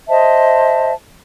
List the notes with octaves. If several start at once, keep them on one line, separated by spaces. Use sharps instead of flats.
C5 D#5 E5 A5